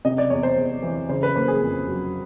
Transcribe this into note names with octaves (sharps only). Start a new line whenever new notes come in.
C3 D#5
D5
E2 C#5
C5
E2
E3
C#3 C5
B4
A#3 C5
G#4
F2
F#3